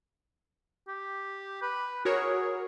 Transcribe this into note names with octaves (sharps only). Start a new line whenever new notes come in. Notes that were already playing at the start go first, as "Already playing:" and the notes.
G4
B4
F#4 G#4 A#4 C#5